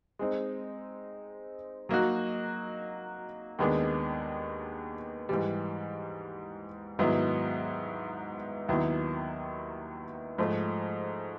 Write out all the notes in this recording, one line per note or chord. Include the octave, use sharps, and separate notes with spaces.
G#3 C4 D#4
F#3 A#3 D#4 F#4
D#2 D#3 G#3 B3 D4
G#2 E3 G3
G#2 D#3 F#3 B3 E4
D#2 D#3 F#3 B3 E4
G#2 F3 A3